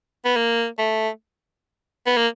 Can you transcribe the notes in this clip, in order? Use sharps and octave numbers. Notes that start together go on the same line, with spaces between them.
B3
A#3
A3
B3
A#3